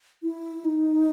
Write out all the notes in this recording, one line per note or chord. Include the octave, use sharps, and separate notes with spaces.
E4
D#4